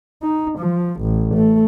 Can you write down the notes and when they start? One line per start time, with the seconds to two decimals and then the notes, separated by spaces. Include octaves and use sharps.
0.22 D#4
0.58 F3
1.01 A1
1.34 A3